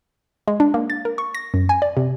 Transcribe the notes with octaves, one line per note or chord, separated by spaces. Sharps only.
G#3
D4
A#3
A6
A#4
C#6
A#6
F#2
G#5
D5
C3